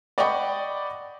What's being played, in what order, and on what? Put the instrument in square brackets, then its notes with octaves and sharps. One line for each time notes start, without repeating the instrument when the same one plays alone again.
[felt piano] D5 D#5 F#5 G5 B5 C#6